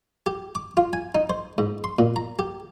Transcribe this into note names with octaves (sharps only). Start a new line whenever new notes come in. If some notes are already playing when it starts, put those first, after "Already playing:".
G4
D6
F4
G#5
D#4
C5
G#2
C6
A#2
A#5
G4